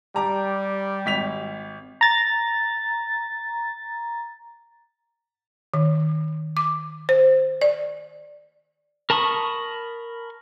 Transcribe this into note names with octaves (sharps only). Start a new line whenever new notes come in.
G3 A#5 D6
G#1 B6 F7
A#5 A6
D#3
D6
C5
D5
A#4 A5 B5 C#6 D#6